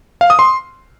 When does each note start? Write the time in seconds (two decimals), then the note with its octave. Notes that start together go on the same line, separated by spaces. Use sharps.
0.21 F5
0.30 D#6
0.39 C6